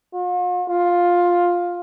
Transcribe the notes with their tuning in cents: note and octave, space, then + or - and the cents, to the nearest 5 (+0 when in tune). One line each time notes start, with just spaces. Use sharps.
F4 +45
F4 +10